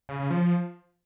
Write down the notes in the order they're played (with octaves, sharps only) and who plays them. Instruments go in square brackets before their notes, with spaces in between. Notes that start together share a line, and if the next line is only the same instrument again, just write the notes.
[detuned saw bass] C#3
C#3
F3